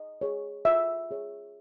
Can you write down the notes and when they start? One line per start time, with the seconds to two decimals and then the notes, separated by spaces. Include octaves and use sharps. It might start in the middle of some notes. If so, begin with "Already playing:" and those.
Already playing: D#5
0.21 G#4 C#5
0.65 F4 E5
1.11 G#4 C#5